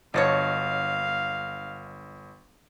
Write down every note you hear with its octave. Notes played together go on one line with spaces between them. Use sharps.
G1 D3 F#3 C#5 D#5 F5 A6